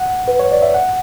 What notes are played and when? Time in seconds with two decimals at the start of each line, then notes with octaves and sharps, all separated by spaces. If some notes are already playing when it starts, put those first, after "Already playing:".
Already playing: F#5
0.28 B4
0.40 C#5
0.52 D5
0.62 E5
0.74 F#5